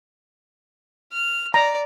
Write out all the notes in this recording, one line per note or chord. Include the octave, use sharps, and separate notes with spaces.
F6
D5 A#5